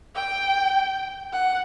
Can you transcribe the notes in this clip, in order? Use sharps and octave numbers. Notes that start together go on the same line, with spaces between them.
G5
F#5